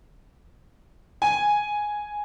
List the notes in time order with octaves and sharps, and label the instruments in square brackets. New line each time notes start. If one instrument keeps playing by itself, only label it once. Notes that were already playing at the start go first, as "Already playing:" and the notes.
[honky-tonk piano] G#5